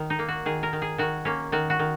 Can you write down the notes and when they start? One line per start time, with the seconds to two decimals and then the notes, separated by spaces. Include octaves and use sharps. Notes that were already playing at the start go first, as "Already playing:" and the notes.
Already playing: D#3
0.10 D#4
0.19 A#3
0.28 F#4
0.46 D#3 G#4
0.63 A#4
0.73 D#3
0.82 G#4
0.98 D#3 F#4
1.25 A#3 C#4
1.52 D#3 F#4
1.70 F#4
1.79 D#3